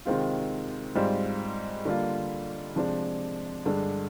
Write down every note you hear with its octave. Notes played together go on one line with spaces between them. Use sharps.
C3 D#3 G#3 C4 F4
G#2 G3 C4 F4
D3 G3 A#3 F4
C3 F3 G#3 D4
G2 D3 G#3 D4